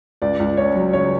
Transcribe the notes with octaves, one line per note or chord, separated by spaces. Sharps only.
C#2 D5
C#2
C#4 C#5
F#3
C#3 C#5